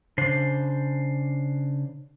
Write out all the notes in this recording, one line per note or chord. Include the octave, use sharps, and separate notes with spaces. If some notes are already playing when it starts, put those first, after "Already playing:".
C#3 D4 C5